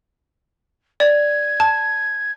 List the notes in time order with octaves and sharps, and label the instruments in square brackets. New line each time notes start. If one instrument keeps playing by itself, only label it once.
[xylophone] D5 [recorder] G#6
[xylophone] A5